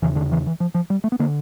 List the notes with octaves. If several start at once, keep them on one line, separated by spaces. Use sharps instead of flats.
E2 C#3 E3
D3
E3
E3
F3
F3
G3
A3
B3
D3 A#3